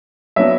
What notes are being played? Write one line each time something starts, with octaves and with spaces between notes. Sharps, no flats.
F#3 B3 D4 E5